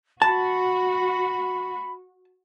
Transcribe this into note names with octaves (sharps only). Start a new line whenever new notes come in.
F#4 A5 B5